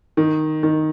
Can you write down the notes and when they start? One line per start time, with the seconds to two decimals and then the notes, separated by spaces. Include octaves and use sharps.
0.17 D#3
0.63 D#3